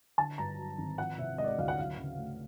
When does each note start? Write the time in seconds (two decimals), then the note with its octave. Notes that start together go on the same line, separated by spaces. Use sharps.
0.18 D3 A5
0.38 G2 A#5
0.58 F#3
0.78 G#1
0.98 F3 F#5
1.18 C3 E5
1.38 G#3 D#5
1.44 D5
1.49 D#5
1.59 D2 F5
1.68 F#5
1.79 F#3 F5
1.98 C#3
2.18 A3